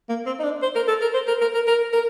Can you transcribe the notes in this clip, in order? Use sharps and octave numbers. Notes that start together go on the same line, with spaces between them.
A#3
C4
D#4
D4
C5
A#4
A4
A#4
C5
A#4
A#4
A#4
A#4
A#4